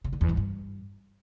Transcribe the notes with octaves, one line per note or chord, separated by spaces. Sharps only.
C#3
D3
E2
G#2
G2